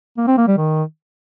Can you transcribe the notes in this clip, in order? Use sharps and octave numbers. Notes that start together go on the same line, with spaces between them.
A#3
C4
A#3
G3
D#3